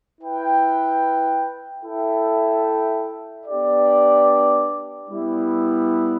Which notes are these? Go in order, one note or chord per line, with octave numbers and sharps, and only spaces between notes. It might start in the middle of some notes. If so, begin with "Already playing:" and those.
E4 B4 G5
E4 A4 E5 G5
B3 D4 G4 D5
G3 B3 E4